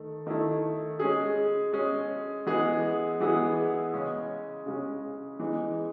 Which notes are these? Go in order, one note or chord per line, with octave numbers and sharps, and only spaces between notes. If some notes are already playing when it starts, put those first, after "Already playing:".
Already playing: D#3 A3
D#3 A3 E4
G#3 C#4 G#4
G#3 C#4 G#4
E3 G#3 B3 E4 G#4
E3 G#3 B3 E4 G#4
C#3 G#3 C#4
C#3 G#3 C#4
E3 G#3 D#4